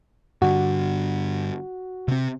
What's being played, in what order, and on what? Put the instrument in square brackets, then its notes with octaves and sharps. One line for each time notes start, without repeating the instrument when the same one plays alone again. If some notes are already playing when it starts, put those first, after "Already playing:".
[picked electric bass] G2 D3 [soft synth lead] F#4
[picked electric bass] C3 C4